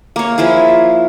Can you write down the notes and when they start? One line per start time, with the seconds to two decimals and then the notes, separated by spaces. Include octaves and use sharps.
0.16 A#3 C#5
0.38 F3 E4 F4 G#4